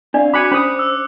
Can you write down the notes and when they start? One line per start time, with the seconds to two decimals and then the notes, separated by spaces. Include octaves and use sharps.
0.14 C4 D4 D5 E5 F5
0.33 F#4 G#5 B5 D6 F#6 C#7
0.52 C#4 C5 B5 D#6
0.79 E6